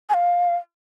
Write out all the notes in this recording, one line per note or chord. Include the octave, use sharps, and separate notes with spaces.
G#5
F5